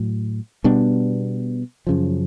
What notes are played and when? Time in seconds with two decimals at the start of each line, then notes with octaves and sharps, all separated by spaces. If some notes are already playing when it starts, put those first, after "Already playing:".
Already playing: A2 F#3
0.64 B2 G3 B3 D4
1.87 F#2 C#3 F3